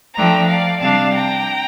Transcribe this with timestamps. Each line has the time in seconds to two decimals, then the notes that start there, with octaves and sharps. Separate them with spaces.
0.15 F3 A3 D4 G5 A#5
0.48 D5 F5
0.80 C3 G3 D4 F5 A5
1.13 G5 A#5